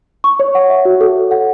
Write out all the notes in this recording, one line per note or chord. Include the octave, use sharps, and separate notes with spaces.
C#6
C#5
F#5
E5
F#4
A4
C#5
F#5